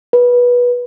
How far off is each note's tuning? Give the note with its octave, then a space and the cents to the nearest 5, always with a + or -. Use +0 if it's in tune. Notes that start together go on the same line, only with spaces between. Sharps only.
B4 -20